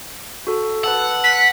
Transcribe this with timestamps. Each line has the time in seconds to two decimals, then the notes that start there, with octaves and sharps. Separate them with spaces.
0.47 F#4 A4
0.84 B4 F#5 A5 E6
1.24 B6